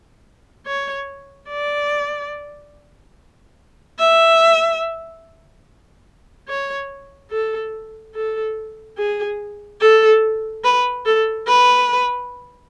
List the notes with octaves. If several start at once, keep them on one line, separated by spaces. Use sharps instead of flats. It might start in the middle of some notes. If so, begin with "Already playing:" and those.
C#5
D5
E5
C#5
A4
A4
G#4
A4
B4
A4
B4